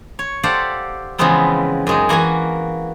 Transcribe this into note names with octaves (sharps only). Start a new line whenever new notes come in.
C#5
G4 A4 C5 D5 F5 F#5
C#3 E3 F3 G#3 B3 C4
F#2 G#3 D#4
E3 A#3 F#4 G#5